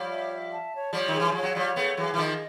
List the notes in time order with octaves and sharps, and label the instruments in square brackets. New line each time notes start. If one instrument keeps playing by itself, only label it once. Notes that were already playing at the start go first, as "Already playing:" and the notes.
Already playing: [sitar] F3 G3 [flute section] C#5
[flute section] E5
E5
A5
C#5
[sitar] F3 G3 [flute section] C#5
[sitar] D#3
[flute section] G#4
[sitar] E3
[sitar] F3 [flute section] C#5
[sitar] F#3
[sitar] F3 G3 [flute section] C#5
[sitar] A3 B3 [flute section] G#4
[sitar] E3 F#3 [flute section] G#4
[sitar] E3
[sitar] D#3 F3 [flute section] D#5